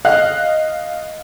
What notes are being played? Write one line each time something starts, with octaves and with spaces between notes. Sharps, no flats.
D#5 F5 F#6